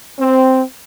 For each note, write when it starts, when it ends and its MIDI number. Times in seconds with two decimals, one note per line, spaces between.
0.20 0.62 60